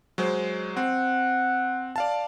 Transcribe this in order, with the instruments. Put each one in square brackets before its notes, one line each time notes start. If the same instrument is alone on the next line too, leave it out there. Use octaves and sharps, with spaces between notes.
[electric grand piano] F#3 G#3 C5
[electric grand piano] C4 [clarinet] F#5
[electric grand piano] D5 F5 A5